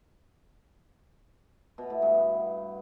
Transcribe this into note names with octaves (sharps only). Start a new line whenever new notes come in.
B2
A2
G2
B3